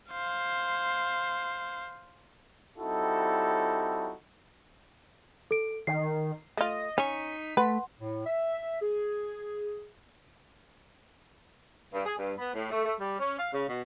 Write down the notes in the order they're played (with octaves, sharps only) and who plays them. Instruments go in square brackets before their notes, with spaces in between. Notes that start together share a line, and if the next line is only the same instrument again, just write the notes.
[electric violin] C5 F5
[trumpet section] G3 C4 D#4 E4 F#4 A4
[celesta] A4 D7
[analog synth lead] D#3 [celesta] C7
[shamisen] A3 F4 [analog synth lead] D#5
[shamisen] C#4 [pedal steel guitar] D#4 C#6 [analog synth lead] B6
[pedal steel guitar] A3 [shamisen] B4 [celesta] F#5 C6
[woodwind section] A2
E5
G#4
[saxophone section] G2
G#4
G2
B3
A2
A3
A3
G3
C#4
F5
C#3
B2